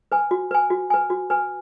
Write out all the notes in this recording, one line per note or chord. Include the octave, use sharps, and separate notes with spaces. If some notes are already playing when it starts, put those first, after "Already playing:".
B4 G#5
F#4
B4 G#5
F#4
B4 G#5
F#4
B4 G#5